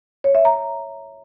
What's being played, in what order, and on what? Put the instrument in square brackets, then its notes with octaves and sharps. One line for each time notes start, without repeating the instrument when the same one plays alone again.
[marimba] C#5
E5
A#5